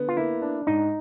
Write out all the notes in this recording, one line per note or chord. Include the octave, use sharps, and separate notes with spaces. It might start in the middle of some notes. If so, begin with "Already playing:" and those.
Already playing: D3 B3
F4
A#3 E4
D4
G#2 D#4